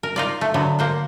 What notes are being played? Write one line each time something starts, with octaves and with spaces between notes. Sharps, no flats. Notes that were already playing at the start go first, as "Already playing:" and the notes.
A#4
D#4 F4 D5
A3
D3 F#3 B3
A#3 C5 F#5